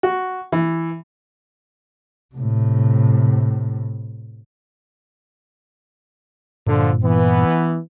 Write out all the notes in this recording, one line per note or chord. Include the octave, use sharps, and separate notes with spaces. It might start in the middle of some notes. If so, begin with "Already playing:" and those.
F#4
E3
A2 C3
G2 A#2 D3 F3
E3 B3